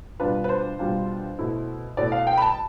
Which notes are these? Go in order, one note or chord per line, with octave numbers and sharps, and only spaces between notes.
B2 G3 D4 F4 B4
B4
C5
B2 G3 D4 F4
B2 A3 E4
B2 A3 E4 D5
F5
G5
B5
A5